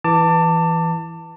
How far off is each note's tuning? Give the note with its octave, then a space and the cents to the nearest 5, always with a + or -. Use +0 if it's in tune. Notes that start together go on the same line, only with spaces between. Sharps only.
E3 +0 A5 +25 D6 +0